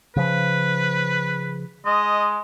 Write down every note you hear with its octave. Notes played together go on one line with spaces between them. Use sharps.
C#3 F3 B4
G#3 D#5